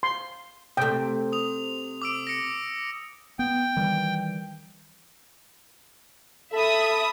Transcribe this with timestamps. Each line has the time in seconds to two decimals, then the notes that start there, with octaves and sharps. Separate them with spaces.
0.03 C6
0.77 C3 A3 G5
1.32 D#6 F7
2.02 D6 E6 D7
2.27 A#6 C#7
3.39 B3 G5
3.77 D#3 E3 G3
6.53 A4 E5 B5 D#6